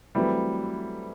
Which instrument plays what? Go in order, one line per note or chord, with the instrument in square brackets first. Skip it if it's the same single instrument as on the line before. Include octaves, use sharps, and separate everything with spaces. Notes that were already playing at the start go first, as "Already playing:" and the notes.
[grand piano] E3 G3 [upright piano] F#3 A3 C4 E4